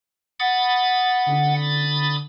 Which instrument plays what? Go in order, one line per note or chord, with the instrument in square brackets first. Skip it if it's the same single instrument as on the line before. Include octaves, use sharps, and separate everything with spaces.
[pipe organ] F#5 [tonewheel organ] B5 D#6 A6
[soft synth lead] D3